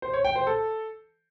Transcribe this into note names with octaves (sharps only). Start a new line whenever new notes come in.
C5
C#5
G5
C5
A4